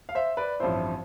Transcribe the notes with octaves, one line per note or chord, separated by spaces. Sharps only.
F5
C5 E5
B4 D5
A1 G2 F3 C4 E4 C5